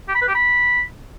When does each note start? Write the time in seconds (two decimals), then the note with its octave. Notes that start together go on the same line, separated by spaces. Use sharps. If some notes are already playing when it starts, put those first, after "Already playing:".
0.08 G4
0.15 B5
0.22 B4
0.28 G4
0.35 B5